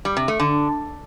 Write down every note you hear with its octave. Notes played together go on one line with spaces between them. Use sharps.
G3
C3
A3
D3